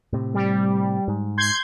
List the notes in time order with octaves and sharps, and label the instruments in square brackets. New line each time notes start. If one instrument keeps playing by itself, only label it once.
[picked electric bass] A2 C3
[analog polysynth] G3
[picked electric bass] G#2
[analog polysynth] C6 G6 G#6